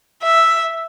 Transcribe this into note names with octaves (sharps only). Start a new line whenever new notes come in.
E5